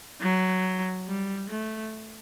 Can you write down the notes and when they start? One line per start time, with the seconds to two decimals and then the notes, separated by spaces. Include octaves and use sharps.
0.21 F#3
1.07 G3
1.50 A3